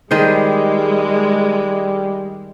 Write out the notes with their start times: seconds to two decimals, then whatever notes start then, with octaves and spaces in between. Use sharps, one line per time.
0.11 D#3 G3 G#3 G#4 C5